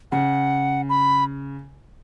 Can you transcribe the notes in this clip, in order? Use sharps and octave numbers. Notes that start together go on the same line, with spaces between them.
C#3 F#5
B5